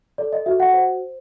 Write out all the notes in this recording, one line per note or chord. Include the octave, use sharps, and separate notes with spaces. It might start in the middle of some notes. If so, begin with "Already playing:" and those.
A4 D5
D#5
F#4 E5
F#5
C5